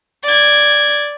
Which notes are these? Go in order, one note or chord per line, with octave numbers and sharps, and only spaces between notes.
D5 G#6